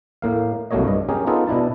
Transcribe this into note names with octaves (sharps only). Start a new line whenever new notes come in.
A2 A#3 F5
C2 F#3 A3 A#3 C#5 D#5
G2 D#5
C#4 G4 G#4 A#4
B3 D#4 F4 G#4 A4
B2 D4 E4 A5